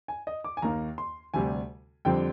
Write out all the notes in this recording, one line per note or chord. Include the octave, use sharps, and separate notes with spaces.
G#5
D#5
D6
G#5
D#2 D#3 A#3 A#5
C6
D2 C3 G3 G#5
F2 D3 G3 C4 G5